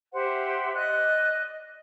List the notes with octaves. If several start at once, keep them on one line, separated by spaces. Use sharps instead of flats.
G4 C5 E5 F#5
D5 D#5 F#6